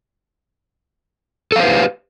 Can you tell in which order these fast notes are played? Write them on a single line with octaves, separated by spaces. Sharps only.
A4 F5 C5 B4 G4